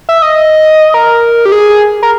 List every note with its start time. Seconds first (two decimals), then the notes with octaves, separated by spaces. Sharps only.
0.09 E5
0.22 D#5
0.94 A#4
1.45 G4
1.52 G#4
2.03 A#4